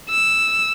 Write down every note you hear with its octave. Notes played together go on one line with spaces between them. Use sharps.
E6